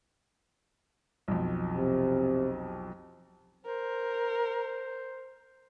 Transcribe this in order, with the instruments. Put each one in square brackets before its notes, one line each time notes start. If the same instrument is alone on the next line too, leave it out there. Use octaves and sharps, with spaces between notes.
[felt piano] B1 F2
[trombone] C3
[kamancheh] A#4 [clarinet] C5